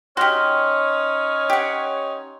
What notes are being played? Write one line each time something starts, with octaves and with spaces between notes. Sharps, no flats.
C#4 D#4 F#4 G4 C#5 C6 F6
G4 F#5